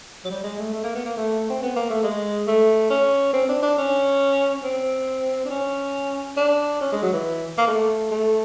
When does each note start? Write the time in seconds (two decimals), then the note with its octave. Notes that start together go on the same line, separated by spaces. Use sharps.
0.25 F#3
0.30 G3
0.44 G#3
0.58 A3
0.73 A3
0.83 A#3
0.95 B3
1.05 A#3
1.17 A3
1.50 C4
1.63 B3
1.76 A#3
1.90 A3
2.03 G#3
2.47 A3
2.90 C#4
3.33 C4
3.49 D4
3.62 D4
3.78 C#4
4.64 C4
5.45 D4
5.50 C#4
6.37 D4
6.81 C#4
6.92 G#3
7.03 F#3
7.13 E3
7.58 A#3
7.67 A3
8.11 A3